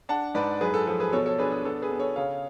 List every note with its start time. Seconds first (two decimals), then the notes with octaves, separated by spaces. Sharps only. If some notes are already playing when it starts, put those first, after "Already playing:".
0.09 D4 F#5 A5
0.34 G#2 B4 D5
0.61 F#2 G#4 B4
0.74 A4
0.87 F3 A4
1.00 G#4 B4
1.12 B2 A4 C#5
1.26 A4 C#5
1.38 D4 G#4 B4
1.51 G#4
1.65 B3 A4
1.82 G#4 B4
1.91 B3
1.99 A4 C#5
2.16 C#3 C#5 F5